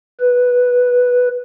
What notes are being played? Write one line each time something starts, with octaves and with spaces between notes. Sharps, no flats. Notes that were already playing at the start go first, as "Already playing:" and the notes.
B4